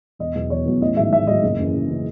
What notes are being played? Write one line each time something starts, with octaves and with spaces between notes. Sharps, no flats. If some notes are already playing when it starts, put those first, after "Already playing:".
E1 D#5
E2 B2 F#3
E1 C#5
E2 B2 F#3
A1 D#5
G#2 D#3 F#3 E5
A1 E5
G#2 D#3 F#3 D#5
F#1
F#2 C#3 E3
F#1
C#3 E3